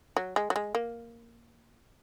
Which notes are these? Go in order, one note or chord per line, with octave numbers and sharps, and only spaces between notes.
F#3
G#3
F#3
G#3
A#3